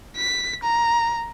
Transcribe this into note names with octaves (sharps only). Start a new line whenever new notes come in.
B6
A#5